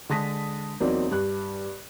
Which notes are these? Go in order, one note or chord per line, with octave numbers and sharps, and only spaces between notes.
D3 G#3 A5 D#6 A#6 B6
E2 F#3 A#3 C4 D#4 D5
G2 F#6